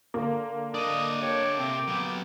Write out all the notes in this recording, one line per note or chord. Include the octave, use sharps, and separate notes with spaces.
D3 A#3
D4 D5 D#5 D#6
G4 C#5
C3 C4
F#3 B3 C4